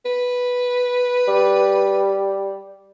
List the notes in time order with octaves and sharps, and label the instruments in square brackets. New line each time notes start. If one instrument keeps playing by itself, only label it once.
[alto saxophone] B4
[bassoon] G3